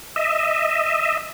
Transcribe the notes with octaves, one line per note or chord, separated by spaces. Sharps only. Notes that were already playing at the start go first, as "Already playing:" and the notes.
D#5 E5